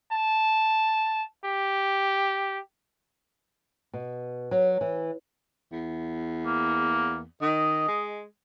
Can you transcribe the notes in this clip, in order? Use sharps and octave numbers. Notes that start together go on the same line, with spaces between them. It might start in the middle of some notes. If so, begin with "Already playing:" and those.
A5
G4
B2
F#3
E3
E2
A#3
D#3 D#5
G#3